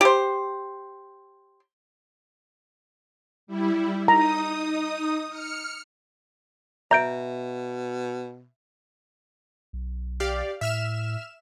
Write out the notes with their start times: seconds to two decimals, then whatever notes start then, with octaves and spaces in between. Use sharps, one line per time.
0.01 G4 C5
3.47 G3 E4
4.08 D#4 A#5 D#6
5.29 F6 C#7
6.91 B2 E5 A#5 G6 D7
9.73 B1
10.20 G4 D5 F5
10.61 A2 E5 F6 E7